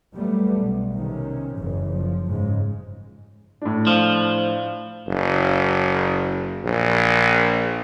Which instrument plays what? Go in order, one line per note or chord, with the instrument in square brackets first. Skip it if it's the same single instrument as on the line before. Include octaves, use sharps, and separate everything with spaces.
[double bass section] F#3 G3 A3 B3
B1
C3 D#3 C#4
F#1 F#2 C#3 E3
F3
G#2 C#3 G#3
[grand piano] A2 D4
[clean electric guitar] F3
[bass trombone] F#1
A#1